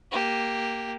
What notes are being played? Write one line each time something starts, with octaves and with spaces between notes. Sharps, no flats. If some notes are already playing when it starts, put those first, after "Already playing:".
A#3 G4